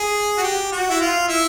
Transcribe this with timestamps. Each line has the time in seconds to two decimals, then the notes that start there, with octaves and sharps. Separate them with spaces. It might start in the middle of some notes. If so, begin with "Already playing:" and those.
Already playing: G#4
0.38 F#4
0.43 G4
0.72 F#4
0.90 E4
1.00 F4
1.28 E4